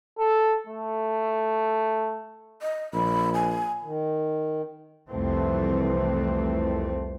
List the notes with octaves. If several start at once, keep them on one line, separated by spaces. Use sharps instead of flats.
A4
A3
D#5
A#1 B5
G#5
D#3
C2 F2 E3 A3 C4